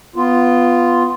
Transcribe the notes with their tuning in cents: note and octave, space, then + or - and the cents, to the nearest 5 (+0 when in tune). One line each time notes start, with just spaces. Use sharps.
B3 +10 F4 -5